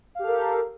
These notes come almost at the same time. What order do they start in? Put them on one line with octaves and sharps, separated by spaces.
F5 G4 A4 A#4